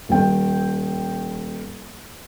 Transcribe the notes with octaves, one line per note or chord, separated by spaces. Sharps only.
D#1 G5